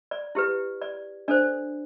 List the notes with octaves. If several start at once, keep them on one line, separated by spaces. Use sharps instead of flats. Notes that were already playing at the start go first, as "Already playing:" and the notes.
D5
E4 G4 B4
D5
D4 A4 C5 D5